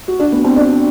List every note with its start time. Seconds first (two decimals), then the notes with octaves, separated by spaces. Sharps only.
0.08 F#4
0.20 D4
0.32 B3
0.44 C4
0.56 D4